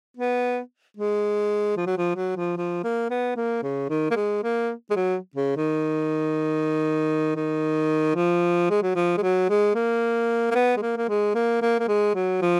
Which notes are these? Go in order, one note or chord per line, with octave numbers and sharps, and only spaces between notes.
B3
G#3
F3
F#3
F3
F#3
F3
F3
A#3
B3
A#3
C#3
D#3
A#3
G#3
A#3
G#3
F#3
C#3
D#3
D#3
F3
G#3
F#3
F3
G#3
F#3
G#3
A#3
A#3
B3
G#3
A#3
A#3
G#3
A#3
A#3
A#3
G#3
F#3
F3